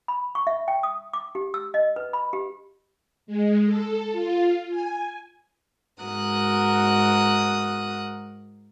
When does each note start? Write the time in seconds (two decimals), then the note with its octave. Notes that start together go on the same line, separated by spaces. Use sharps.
0.08 B5
0.35 C#6
0.47 E5
0.68 G5
0.83 D#6
1.13 D6
1.35 G4
1.54 E6
1.74 D#5
1.96 B4
2.13 B5
2.33 G4
3.27 G#3
3.65 A4
4.12 F4
4.70 G#5
6.02 G#2 F#4 A#4 D#6 F#6